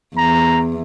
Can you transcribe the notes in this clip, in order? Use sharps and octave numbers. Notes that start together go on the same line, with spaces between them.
E2 A#5